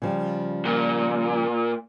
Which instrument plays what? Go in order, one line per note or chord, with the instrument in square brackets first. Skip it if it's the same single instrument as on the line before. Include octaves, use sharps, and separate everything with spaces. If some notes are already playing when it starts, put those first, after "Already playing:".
[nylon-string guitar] C#3 F3 G3
[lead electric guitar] A#2